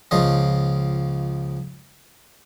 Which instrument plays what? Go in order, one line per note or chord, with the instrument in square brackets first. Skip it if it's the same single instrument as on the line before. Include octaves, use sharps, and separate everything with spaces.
[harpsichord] C#2 F3 F4 D#5